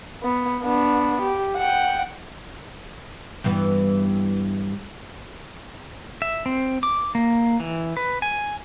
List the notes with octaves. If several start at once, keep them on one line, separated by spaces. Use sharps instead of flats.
B3
B3 D4
G4
F#5 G5
G2 E3 B3
E5
C4
D6
A#3
E3
B4
G#5